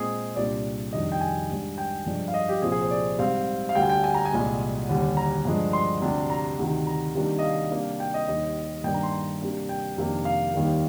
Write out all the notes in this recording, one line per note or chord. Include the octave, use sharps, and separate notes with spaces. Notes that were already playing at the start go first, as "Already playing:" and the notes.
Already playing: A#2 G#3 C4 G#4
C2 A#2 G3 D4 D5
F2 C3 D#3 G3 D4 D#5
G5
G#5
G#2 G3 D4
G5
G2 F3 G#3 D4
F5
D#5
G4
C2 A#2 F3 C4 G#4
G#4
C5
D5
G#2 G3 C4 F5
F5
D2 D3 G3 G5
G#5
G5
G#5
A#5
G#5
C2 A#2 G#3
D#2 D3 G3
A#5
G2 F3 G#3 D4
C6
D2 C3 G3 D4
A#5
D2 C3 D#3
A#5
C3 D#3 G3 A#3 D4
D#5
F5
C3 G3 A#3 D4
G5
D#5
D#2 D#3 G3 D#5
G2 D#3 A#3 D4 G5
A#5
C6
A#5
C3 G3 A#3 D4
G5
F2 C3 D#3 A#3 D4
F5
D#2 D#3 G3 A#3